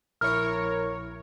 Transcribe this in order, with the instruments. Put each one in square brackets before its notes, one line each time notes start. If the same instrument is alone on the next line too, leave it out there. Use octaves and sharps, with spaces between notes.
[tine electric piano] A#1 E4 C#6 [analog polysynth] A#4 C#5 [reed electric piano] F6